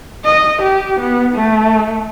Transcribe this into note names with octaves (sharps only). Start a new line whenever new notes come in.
D#5
G4
B3
A3